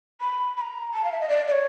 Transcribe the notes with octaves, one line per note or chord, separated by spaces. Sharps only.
B5
B5
A#5
A5
F5
E5
D#5
D5
D5
C#5